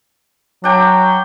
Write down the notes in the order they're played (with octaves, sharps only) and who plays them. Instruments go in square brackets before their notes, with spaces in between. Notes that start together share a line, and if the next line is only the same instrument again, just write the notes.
[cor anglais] F#3 [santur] D4 G5